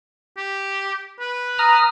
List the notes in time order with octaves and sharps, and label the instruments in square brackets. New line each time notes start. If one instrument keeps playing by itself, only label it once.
[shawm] G4
B4
[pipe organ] A#5 D#6 F6